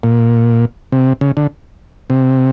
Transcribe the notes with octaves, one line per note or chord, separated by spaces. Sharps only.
A#2
C3
C#3
D3
C3